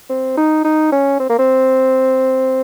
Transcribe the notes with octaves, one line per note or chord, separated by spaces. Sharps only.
C4
D#4
D#4
C#4
C4
A#3
C4